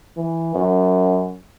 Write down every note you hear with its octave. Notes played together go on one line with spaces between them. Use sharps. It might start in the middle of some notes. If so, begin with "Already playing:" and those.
E3
F#2